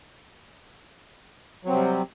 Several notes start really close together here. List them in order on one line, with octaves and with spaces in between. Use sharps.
F#3 C4 C3 G3